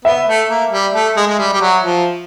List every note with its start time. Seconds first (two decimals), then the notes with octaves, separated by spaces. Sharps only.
0.05 B3 E5
0.27 A3
0.49 A#3
0.71 G3
0.94 A3
1.17 G#3
1.27 G#3
1.39 G3
1.53 G3
1.62 F#3
1.84 F3